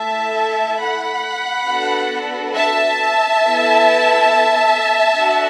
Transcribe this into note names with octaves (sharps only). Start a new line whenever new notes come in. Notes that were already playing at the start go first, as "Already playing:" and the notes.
Already playing: A3 E4 A4 E5 A5
F#5 B5
B3 D4 F#4 A4
E5 A5
B3 E4 A4
D4 F#4 A4